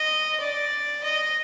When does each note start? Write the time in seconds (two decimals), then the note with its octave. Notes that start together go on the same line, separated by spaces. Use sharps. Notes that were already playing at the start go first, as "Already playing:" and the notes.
Already playing: D#5
0.40 D5
1.04 D#5